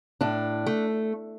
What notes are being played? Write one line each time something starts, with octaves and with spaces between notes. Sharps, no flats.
A2 D4
A3